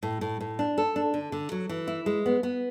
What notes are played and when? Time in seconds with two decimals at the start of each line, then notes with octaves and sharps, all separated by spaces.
0.03 A2
0.21 A2
0.40 A2
0.59 D4
0.78 A4
0.96 D4
1.14 D3
1.32 D3
1.52 F#3
1.69 E3
1.87 E4
2.06 G#3
2.26 B3
2.43 B3